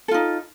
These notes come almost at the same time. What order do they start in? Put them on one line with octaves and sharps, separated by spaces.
A4 F4 D#4